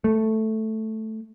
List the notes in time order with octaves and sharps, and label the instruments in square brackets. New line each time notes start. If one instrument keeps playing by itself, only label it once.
[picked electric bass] A3